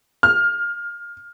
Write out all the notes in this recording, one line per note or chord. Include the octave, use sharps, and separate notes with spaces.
F6